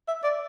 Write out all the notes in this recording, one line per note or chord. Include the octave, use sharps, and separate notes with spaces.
E5
D5